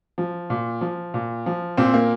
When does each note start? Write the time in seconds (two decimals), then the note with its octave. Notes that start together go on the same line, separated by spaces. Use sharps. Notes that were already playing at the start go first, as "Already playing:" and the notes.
0.18 F3
0.50 A#2
0.81 F3
1.14 A#2
1.46 F3
1.77 A#2 C4
1.94 A#3